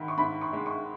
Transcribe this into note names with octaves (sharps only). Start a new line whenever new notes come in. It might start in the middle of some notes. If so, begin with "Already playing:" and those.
Already playing: G#2 D#3 B5
C#6
G#2 B5
C#6
G#3
C#6